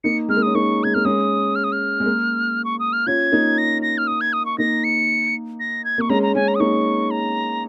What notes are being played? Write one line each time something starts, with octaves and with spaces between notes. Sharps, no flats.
A#3 D#4 C#7
G#3 F6
A#3
C#4 D#6
A#3 D#4 C#6
G#3 G#6
A#3 F6
G#3 C#4 D#6
F6
D#6
F6
G#3
A#3
C#6
D#6
F6
C#4 F4 G#6
A#3 D#4
A#6
A#6
F6
D#6
G#6
D#6
C#6
A#3 D#4 A#6
C#7
A#6
G#6
A#3 C#6
G#3 C#4 A#5
A#5
G#3 C#4 G#5
A#5
D#6
A#3 D#4 C#6
A#5